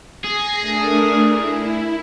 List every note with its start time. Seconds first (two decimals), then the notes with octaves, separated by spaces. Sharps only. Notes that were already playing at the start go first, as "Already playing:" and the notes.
0.24 G#4 A#6 C7
0.59 A3 D4 A#4
1.29 E4